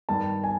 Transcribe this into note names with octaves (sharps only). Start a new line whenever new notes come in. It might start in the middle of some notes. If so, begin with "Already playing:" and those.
G2 D#3 A5
G#5